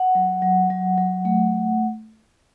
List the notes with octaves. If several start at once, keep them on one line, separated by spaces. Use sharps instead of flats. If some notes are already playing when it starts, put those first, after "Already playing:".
Already playing: F#5
F#3
F#3
F#3
F#3
A3